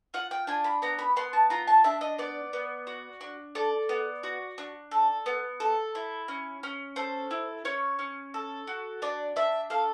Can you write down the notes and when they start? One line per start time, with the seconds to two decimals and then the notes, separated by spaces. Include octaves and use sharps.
0.14 F4 F#5
0.31 G5
0.47 D4 G#5
0.64 B5
0.82 B3 A#5
0.99 B5
1.16 B3 C6
1.33 A5
1.50 F4 A#5
1.67 A5
1.84 D4 E5
2.01 D#5
2.18 B3 D5
2.53 B3
2.87 F#4
3.21 D4
3.55 A4 D5
3.89 B3
4.23 F#4
4.58 D4
4.91 A4
5.26 B3
5.60 A4
5.95 E4
6.28 C#4
6.63 C#4
6.96 A4 C5
7.31 E4
7.65 C#4 C#5
7.99 C#4
8.34 A4
8.67 F#4
9.02 D4 D5
9.36 D4 E5
9.70 A4 F5